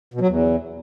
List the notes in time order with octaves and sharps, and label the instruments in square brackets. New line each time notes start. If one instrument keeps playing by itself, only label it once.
[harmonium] B2
F#3
E2